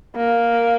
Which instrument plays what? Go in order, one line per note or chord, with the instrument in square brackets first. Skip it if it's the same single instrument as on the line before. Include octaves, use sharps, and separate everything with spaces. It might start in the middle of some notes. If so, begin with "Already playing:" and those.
[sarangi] A#3